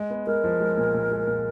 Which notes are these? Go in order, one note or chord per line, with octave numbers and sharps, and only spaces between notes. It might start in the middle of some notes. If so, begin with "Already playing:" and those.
Already playing: G#3
B3
G#3 A#4
F3
G#3
A#2
A#2
G#3
A#2